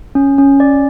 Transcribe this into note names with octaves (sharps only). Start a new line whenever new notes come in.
C#4
C#4
D5